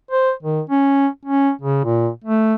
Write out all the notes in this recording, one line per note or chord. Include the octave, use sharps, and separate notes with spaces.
C5
D#3
C#4
C#4
C#3
A#2
A3